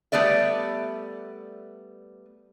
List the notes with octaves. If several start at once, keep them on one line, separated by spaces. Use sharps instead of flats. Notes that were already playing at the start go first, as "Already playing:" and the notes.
G3 A3 B3 D5 E5